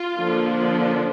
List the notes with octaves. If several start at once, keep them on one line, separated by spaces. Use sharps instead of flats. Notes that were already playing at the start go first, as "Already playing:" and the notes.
Already playing: F4
D3 F3 A#3 D4